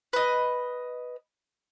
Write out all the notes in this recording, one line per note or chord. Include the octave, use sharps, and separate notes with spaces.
B4 D#5